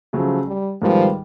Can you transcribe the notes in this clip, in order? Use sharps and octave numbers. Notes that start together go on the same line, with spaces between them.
C#3 F3 F#3 A3
G3
G#2 D#3 F3 G3 B3